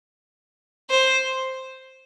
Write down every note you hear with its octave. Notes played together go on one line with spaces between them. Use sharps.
C5